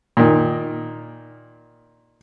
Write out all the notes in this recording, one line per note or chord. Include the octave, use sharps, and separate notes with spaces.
A#2 D#3